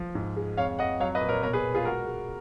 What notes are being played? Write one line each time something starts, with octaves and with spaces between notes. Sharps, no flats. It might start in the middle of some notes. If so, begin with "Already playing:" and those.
Already playing: F3
G#2
G#3
F2 C#5 F5
F2 D#5 F#5
F#3 C#5 F5
B4 D#5
A#2
A#4 C#5
B2 A#4 C#5
G#4 B4
B2
F4 G#4
G#3 F#4 A#4
G#3